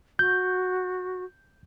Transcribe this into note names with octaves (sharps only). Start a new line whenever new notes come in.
F#4 G6